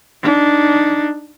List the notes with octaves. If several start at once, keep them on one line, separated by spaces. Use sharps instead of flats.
D4 D#4